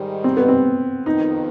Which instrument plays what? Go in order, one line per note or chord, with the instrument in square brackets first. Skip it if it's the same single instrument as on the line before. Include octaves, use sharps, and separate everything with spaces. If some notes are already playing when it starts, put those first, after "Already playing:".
Already playing: [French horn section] G#2 D#3 G3
[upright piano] C4
B3
C4
[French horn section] F2 D#3 B3 [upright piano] D#4